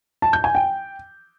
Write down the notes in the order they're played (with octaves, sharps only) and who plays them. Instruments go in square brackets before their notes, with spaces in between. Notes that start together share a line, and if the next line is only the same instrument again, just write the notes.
[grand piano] A5
G6
G#5
G5